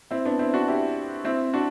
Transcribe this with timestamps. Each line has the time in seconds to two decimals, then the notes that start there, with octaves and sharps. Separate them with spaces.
0.11 C4 E4
0.25 B3 D4
0.39 C4 E4
0.53 D4 F#4
0.68 E4 G4
1.24 C4 E4
1.54 D4 F#4